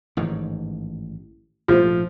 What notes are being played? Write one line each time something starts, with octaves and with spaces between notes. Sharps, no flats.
A1 G#2 D#3
A#1 G#2 F3 A3